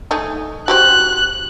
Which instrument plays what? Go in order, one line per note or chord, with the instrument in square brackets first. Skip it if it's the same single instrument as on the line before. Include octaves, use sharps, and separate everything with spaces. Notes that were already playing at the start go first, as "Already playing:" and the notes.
[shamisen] A3 D#4 G#4
[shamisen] F#4 G4 C5 [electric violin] F#6